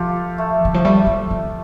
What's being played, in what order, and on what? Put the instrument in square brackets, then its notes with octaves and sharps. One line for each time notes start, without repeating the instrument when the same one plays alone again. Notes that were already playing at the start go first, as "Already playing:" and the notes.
Already playing: [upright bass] F3 [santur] F4 G4 A4
[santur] A3
[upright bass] D3
F3
[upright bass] G3 [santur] A3
[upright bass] F3
D3